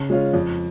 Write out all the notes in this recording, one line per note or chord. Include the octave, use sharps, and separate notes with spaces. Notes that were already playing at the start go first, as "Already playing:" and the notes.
Already playing: C#3
G#3 C#4 F4
F2